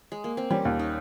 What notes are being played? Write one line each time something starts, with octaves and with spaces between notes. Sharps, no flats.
G#3
A#3
C4
G3 C#4
D#2
D#4